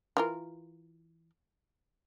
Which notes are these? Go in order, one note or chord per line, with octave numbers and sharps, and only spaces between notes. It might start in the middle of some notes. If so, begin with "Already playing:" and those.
E3 F4 A#4